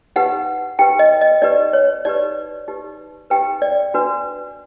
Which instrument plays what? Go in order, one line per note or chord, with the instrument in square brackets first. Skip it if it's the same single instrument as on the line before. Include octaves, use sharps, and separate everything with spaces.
[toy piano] D#4 G4 B4 F#5
D#4 G4 B4 G5
D#5
D#5
D#4 G4 B4 D5
C#5
D#4 G4 B4 D5
D#4 G4 B4
D#4 G4 B4 G5
D5
D4 F#4 B4